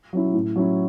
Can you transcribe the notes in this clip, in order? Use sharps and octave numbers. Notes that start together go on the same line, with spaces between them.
F#3 C#4 E4
A2
F#3 C#4 E4